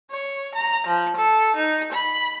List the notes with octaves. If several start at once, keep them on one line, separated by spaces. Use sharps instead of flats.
C#5
A#5
F3
A4
D#4
B5